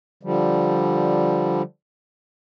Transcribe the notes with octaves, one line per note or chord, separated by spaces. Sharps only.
D3 F3 G3